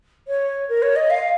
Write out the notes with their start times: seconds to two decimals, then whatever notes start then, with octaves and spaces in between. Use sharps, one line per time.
0.27 C#5
0.69 A#4
0.82 C#5
0.96 D#5
1.10 F5